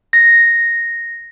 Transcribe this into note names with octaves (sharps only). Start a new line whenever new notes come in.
A#6